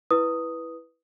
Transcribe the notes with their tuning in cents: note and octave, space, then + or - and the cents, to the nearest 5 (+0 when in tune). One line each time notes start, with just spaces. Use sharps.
E4 +0 B4 -5 D#6 +0